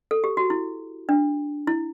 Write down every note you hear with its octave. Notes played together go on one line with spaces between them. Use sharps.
A4
G4
F#4
E4
D4
E4